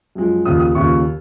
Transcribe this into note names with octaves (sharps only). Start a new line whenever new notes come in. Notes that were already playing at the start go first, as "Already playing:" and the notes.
F#2 F3 G#3
D#2 C#3 F3 D#6
D#6
D#2 C#3 F3 C#6